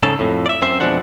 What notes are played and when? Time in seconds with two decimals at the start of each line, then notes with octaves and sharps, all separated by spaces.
0.03 G#2 C#3 A4
0.19 F2 A2
0.46 D5 E5
0.62 F#2 C4 C5 E5
0.80 F2 B2 F3 G#3 D4 F#5